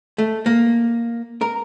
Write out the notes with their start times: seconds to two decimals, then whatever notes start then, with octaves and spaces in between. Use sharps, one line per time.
0.18 A3
0.46 A#3
1.41 A#4